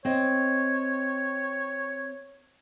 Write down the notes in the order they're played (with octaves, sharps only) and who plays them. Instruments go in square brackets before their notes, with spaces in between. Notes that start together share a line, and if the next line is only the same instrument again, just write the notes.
[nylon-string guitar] C4 D#5 [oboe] C#5